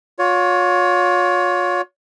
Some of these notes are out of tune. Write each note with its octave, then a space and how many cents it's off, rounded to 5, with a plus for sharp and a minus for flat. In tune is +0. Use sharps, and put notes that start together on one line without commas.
F4 +40 C#5 +25